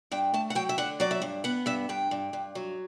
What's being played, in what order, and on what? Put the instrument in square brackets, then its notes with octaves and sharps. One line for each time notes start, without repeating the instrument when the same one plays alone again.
[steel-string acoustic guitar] G2 G5
A3 A5
F#5
F#3 G5
E5
D3 F#5
F#3 D5
E5
G2
B3 F#5
G2 E5
G2 G5
G2
G2
F#3